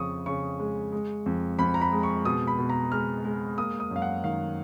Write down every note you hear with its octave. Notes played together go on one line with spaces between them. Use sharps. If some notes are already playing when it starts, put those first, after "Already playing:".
Already playing: F2 C#3 C#6 D#6
C#3 C#6
G#3
G#3
F2
F2 B5
A#5
B5
G#3
C#6
B2 D#6
B5
B2
A#5
G#3 F6
G#3
A#3 D#6
D#6
F#2 F5
F#5
D#3 F5